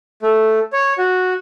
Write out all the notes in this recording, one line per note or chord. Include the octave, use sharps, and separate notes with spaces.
A3
C#5
F#4